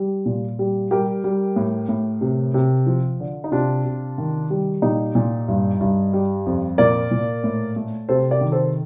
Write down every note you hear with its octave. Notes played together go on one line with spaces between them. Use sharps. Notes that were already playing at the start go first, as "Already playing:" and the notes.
Already playing: G3
A#2
G3
G3 G4 A#4
G3
A2
A2
C3
C3
F3
D3
D#4
C3 D4 F4
C3
D#3
G3
A#2 D#4 G4
A#2
G2
G2
G3
F2
A#2 A#4 D5
A#2
A2
A3
C3 A4 C5
A#4 D5
D#3
A4 C5